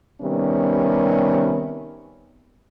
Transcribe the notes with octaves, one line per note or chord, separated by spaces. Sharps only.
C3 D#3 G3 B3 C#4